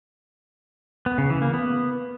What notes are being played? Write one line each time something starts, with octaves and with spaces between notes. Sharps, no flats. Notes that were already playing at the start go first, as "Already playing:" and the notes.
B3
C#3
E3
A#3
B3